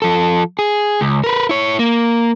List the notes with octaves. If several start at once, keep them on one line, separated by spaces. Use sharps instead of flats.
F3 A4
G#4
C#2
A#4 B4
E4 C#5
A#3